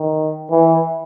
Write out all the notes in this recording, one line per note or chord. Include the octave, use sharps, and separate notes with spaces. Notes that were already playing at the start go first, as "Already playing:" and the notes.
Already playing: D#3
E3